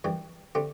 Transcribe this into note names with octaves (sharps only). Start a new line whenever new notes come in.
F#2 E3 G3
D3 A3 C4 G4